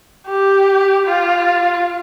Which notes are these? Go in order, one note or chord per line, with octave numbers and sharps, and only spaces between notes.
G4
F4